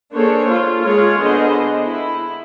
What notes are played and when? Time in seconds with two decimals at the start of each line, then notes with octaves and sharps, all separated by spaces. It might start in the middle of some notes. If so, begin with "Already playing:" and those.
0.14 A#3 D4 G#4 A4 C5 C#5
0.49 F4
0.83 G#3 F4 G#4 A#4 C#5
1.21 D3 B3 G#4 C5 D#5
1.86 E4